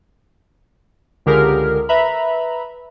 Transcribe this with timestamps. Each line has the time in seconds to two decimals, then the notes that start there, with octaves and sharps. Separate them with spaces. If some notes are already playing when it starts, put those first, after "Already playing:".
1.26 C#2 D3 G4 G#4 A#4 F6
1.89 B4 E5 A#5 B5